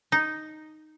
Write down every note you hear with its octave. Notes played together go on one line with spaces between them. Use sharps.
D#4